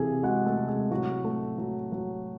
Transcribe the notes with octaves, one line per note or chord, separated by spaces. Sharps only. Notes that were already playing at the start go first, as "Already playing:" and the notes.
Already playing: C3 E3 G#4 A4 G#5
G#3 F#4 F#5
A3 A4
C3
G#3 G#4
A2 F#3 F#4
A3
F#3
F#3